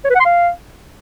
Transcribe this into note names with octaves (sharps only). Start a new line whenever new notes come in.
C#5
B4
F#5
C6
F5